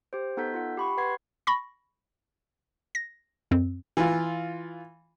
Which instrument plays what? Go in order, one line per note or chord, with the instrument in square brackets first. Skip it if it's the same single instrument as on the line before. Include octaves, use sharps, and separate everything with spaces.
[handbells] G4 C5
B3 D#4 A4 F#5 G6 B6
F4 F#5
G4 B5 C#6
B4 F#5 C6 G#6 C7
[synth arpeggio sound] B5 C#6 A#6
A#6
F#2 C4
[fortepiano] E3 F4